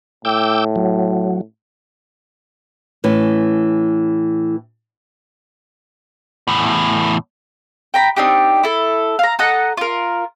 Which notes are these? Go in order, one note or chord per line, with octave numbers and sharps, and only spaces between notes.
A2 G5 D6 E6
F#3
A2 E3 C#4
E2 A2
G5 A#5 B5
C4 D4 D#4 G4
E4 A4
F5 A#5
A4 D#5 F#5 A#5
F4 A#4